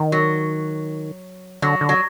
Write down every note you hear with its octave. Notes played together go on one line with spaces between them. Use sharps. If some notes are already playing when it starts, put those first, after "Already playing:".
Already playing: D#3
F#3
D3 F#3
D3
F#3